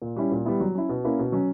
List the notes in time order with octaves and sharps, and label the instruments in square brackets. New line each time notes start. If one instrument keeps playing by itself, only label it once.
[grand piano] A#2
G3 C#4 E4
A#2
G3 B3 E4
F#3
C#4 E4
B2
A#3 C#4 E4
B2
F#3 C#4